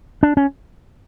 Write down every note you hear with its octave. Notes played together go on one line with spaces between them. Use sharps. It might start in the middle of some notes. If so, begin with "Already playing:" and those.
D4
C#4